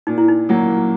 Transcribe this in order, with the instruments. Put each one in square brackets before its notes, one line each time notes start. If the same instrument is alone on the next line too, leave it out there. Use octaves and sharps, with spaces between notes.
[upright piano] A#2 [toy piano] D#4
[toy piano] E4
D#4
[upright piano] F#3 A#3